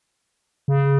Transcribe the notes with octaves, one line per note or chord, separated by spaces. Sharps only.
C#3